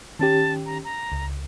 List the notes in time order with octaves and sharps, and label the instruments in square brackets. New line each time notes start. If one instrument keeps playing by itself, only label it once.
[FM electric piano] D#3 C#4 G4 [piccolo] A5
[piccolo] A#5
A#5
[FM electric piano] C#2